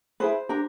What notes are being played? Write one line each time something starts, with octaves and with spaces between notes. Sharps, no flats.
E4 G#4 B4 C5
D4 G4 A#4